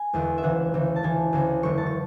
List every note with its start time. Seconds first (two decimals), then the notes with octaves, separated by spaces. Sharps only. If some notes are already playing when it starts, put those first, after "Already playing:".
Already playing: G#5
0.13 E1 E2 D3
0.38 E5
0.43 D2 C#3 E3 F#5
0.74 D2 C#3 E3
0.96 A5
1.03 D2 C#3 E3 G#5
1.33 D2 C#3 E3
1.63 F#1 E2 D3 C#6
1.78 A5
1.86 C#6